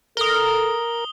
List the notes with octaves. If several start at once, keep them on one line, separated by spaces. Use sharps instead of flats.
A4 A#4 D#6 G7